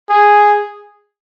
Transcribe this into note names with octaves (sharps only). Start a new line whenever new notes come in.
G#4